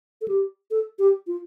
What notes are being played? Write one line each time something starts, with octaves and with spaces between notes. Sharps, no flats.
A4
G4
A4
G4
F4